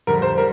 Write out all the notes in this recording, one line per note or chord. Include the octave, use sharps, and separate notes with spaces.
F2 D3 G3 A#4
C5
G3 A#4